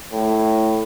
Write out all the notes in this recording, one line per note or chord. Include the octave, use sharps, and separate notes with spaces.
A2